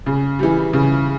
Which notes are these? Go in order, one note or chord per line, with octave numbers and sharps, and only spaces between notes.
C#3
E3 G3
C#3